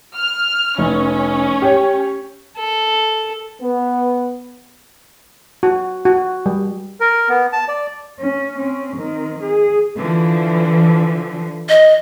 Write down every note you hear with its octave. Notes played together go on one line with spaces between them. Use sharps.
F6
F1 C#4
G4 C#5
A4
B3
F#4
F#4
G3
A#4
B3
A5
D5
C#4
C4 C#4
D#3 C4
G#4
D3 E3 F3
D#5